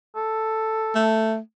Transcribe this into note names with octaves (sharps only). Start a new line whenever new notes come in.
A4
A3